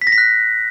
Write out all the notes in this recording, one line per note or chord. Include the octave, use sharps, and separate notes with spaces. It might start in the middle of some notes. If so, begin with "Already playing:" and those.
B6
A#6
B6
F#6